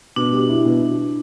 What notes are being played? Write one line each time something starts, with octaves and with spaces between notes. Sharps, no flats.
B2 D4
G3
E4
B2